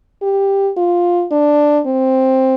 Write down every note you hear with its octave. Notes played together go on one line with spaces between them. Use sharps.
G4
F4
D4
C4